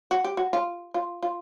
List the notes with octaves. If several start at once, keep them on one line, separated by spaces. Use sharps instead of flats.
F#4
G4
F#4
F4
F4
F4